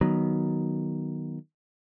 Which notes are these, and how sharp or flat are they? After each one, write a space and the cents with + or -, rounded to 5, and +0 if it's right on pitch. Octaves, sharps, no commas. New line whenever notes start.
D#3 +0 F#3 +10 B3 -15